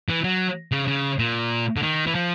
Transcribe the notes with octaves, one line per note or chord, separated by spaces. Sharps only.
E3
F#3
C#3
C#3
A#2
D3
D#3
E3
F3